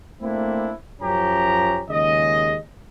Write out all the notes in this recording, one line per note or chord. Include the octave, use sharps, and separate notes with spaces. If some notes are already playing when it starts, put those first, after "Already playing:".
A3 A#3 C4 D4 E4
F#2 F3 C#4 G4 A#5
D#2 C#3 G#3 D#5